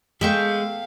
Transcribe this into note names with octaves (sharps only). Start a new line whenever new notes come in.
G#3 B3 A4 E5 F5 G5 C#6